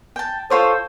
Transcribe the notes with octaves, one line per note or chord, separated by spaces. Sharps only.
G5 A5
F4 A4 C5 C#5 D#6